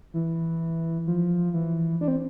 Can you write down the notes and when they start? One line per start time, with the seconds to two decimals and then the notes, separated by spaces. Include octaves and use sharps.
0.14 E3
1.07 F3
1.53 E3
2.01 D4
2.08 C4